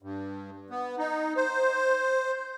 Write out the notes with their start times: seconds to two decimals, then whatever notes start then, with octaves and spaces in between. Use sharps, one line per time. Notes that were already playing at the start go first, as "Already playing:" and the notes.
0.03 G2
0.70 B3
0.98 D#4
1.37 C5